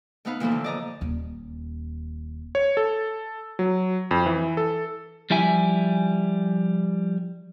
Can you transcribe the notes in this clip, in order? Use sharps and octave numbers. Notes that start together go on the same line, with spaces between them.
A3 B3 D#4 B4 F5
A#2 E3 F3 A#3 E4 A4
D3
D5 D#5 A#5
D#1 D#2
C#5
A4
F#3
F2
E3
A4
F3 G3 E4 E5 G#5